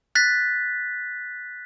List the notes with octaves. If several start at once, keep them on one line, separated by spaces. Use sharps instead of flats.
F#6 A6 B6